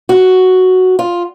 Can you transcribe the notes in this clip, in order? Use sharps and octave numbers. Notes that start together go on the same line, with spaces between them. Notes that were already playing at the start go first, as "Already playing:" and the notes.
F#4
F4